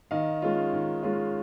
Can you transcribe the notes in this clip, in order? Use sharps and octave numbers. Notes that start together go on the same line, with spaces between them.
D#3 D#5 F5
G#3 C#4 F4
D#3
G#3 C#4 F4